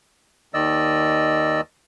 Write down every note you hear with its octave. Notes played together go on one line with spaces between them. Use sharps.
D#2 D#3 D5 D#5 E6